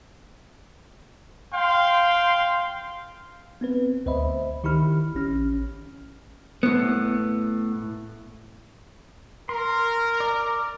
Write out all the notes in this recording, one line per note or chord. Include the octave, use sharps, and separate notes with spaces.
F5 G5 C6
B3 C4 B4
D2 C5 D#5 E5 B5
D#3 E4 G4 B5 F6
A1 C#4 F6
A2 B3
A#4 C6
D5